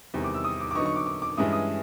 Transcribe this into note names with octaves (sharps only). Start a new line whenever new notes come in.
E2 C3 D#3 G3
D6
E6
D#6
D6
D6
D3 F#3 B3 D#4 C#6
C#6
D6
D6
D6
G2 E3 G#3 C#4 E4 D#6
D#6